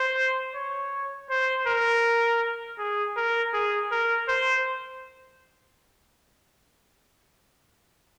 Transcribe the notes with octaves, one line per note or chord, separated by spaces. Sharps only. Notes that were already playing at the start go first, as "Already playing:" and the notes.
Already playing: C5
C#5
C5
A#4
G#4
A#4
G#4
A#4
C5